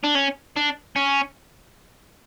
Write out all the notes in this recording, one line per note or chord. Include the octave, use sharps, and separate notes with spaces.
D4
C#4
D4
C#4